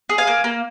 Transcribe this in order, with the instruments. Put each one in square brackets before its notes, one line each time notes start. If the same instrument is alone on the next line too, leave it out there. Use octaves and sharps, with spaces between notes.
[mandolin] G#4
F5 G#5
A#3
A#3